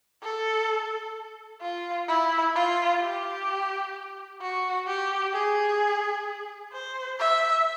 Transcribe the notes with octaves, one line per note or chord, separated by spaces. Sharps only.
A4
F4
E4
F4
G4
F#4
G4
G#4
C5
E5